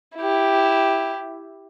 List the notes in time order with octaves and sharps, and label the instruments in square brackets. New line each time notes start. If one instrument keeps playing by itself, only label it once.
[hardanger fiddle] E4 G4